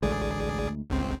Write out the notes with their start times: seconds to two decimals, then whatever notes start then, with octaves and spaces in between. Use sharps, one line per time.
0.02 A1 D2 G#3 A3 G#4 D5
0.90 G1 C#2 C4